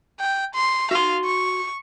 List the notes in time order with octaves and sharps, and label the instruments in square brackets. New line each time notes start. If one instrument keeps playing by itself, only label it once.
[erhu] G5
C6
[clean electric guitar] F#4 C6 [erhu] F5
[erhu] C#6